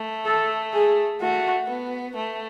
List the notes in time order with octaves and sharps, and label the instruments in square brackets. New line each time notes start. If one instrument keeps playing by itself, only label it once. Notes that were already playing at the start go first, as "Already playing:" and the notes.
Already playing: [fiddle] A3
[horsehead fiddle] A4
G#4
[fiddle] A3 [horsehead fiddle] F#4
[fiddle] B3
A3